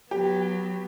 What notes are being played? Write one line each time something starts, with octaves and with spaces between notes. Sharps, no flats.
F#3 B3 G4